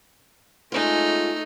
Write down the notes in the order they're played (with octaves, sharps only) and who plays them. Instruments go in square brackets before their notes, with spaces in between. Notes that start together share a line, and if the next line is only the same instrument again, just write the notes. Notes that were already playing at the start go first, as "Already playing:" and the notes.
[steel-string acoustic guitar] G#3 C#4 F4 [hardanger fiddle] A3 D#4